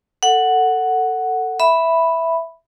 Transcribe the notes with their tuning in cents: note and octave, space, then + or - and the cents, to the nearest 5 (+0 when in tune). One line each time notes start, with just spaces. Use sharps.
A4 +20 F#5 +0
E5 +0 B5 +0